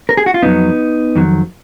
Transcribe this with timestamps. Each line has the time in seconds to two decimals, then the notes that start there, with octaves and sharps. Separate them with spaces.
0.09 A#4
0.17 G#4
0.26 F#4
0.34 F4
0.42 F2 D#3 F#3 B3 D#4
1.15 F2 D#3 F#3